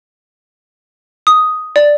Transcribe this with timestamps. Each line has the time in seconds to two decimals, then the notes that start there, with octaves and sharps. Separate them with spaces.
1.27 D#6
1.76 D5